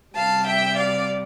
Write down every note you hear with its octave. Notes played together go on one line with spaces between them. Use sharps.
C3 G3 F5 A5
E5 G5
D5 F5